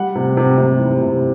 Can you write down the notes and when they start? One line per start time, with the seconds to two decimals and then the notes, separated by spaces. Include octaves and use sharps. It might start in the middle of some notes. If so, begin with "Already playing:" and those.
Already playing: G3 F#5
0.15 C3
0.37 C3
0.58 C3
0.80 E3
1.02 C3